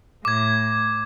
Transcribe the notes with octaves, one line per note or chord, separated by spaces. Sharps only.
A2 D6 G#6